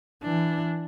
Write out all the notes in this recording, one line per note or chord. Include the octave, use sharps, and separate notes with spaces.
E3 D4